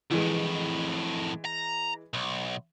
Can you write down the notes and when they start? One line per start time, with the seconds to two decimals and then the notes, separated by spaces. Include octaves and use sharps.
0.11 F2 A2 E3 G#3
1.45 A#5
2.14 B1